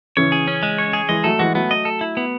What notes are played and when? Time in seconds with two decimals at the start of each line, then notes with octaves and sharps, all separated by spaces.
0.17 C#3 E3 C#5
0.32 G#4
0.48 C#4
0.63 G#3
0.78 C#5
0.93 G#4
1.09 E3 G#3 D#5
1.24 F#3 A3 A4
1.39 E3 G#3 F#4
1.55 F#3 A3 B3
1.71 D#5
1.85 A4
2.01 E4
2.17 B3